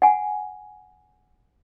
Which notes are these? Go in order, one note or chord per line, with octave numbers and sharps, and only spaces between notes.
F#5 G#5